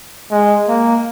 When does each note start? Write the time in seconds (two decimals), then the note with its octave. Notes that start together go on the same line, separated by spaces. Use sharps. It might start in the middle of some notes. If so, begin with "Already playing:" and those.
0.31 G#3
0.68 A#3